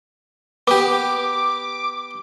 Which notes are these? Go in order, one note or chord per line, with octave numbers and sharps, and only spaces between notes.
B3 G4 D6